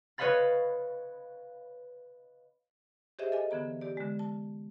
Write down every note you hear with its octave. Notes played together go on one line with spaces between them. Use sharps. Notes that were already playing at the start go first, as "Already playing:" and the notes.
B4 C#5 D#5 F5 B5 A6
G4 G#4 C5 C#5 D#5 E5
A4 D#5 G#5
D3 E3 B3 A#5
G4 D5
D3 G#3
A5